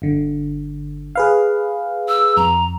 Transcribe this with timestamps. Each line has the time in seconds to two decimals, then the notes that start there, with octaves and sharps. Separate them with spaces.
0.02 G1 D3
1.15 G#4 B4 F5
2.09 E6
2.37 F2 A#5